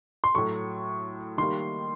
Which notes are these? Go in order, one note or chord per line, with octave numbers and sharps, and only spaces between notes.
C6
A2 F#3 A3 C#6
D#3 G3 A#3 C6